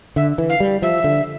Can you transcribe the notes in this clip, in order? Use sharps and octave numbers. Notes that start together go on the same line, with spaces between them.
D3 E5
E3
F5
G3
F3 E5
D3